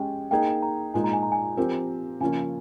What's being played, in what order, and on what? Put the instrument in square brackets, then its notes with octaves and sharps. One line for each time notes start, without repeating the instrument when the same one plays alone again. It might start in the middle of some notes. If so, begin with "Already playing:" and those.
Already playing: [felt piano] G#3 C#4 G4 [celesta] G5
[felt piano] A#3 D#4 G#4 [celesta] G5
[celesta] A#5
[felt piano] A#2 G#3 D#4 A#4 [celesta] G#5
[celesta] A#5
G#5
A#5
G#5
[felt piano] F3 C4 G4 A#4
[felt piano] C#3 F3 A#3 C#4 [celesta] G#5